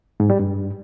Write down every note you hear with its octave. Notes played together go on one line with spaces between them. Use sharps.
G#2
G3
G2